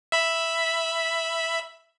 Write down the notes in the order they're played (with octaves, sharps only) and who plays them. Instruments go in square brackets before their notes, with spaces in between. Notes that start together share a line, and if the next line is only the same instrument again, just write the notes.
[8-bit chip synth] E5 B5